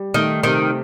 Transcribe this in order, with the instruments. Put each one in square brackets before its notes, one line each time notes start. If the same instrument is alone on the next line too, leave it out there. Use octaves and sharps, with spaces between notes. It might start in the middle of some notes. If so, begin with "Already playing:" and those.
Already playing: [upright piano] G3
[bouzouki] D#3 [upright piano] A3
[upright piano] C3 [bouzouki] D#3